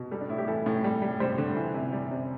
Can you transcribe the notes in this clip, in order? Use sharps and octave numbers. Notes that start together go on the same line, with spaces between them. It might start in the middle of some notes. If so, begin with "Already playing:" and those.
Already playing: B2
G3 A4
D4
A2 E4
G4
E3 A4
A2
G3
G3
G3 C5
D3
E3
C3
G3 D5
C3